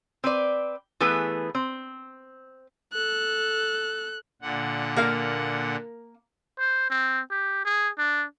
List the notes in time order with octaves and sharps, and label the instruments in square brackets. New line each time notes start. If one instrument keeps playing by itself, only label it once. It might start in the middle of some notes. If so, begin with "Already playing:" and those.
[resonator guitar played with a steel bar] C4 B4 D5
E3 A3 B3 G#4 B4
C4
[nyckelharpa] A4 [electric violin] F#6
[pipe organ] A#2 D3 F#5
[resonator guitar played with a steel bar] A#3 A#4 F5
[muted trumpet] C5
C4
G4
G#4
D4